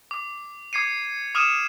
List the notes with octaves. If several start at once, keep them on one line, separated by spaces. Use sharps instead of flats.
D6
D6 G#6 C7 C#7 D#7
D6 D#6 F6 C#7 D#7 E7